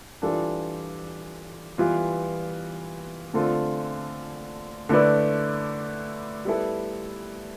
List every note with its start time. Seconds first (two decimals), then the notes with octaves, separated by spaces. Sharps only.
0.22 E3 G3 D4 F4 A4
1.78 E3 G3 B3 F4
3.34 D3 A3 C4 F4 A4
4.89 D3 A3 E4 B4 D5
6.45 G3 B3 E4 A4